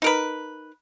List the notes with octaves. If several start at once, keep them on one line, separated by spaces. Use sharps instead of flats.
D#4 A#4 B4